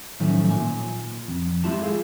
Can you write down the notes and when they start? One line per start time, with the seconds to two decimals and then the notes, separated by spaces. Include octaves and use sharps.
0.20 A2 D#3 F3 F#3 A3 C#4
0.50 A#2 G#5
1.28 F2
1.64 G#3 E4 F4 G4 A5
1.82 G#4 A4 F5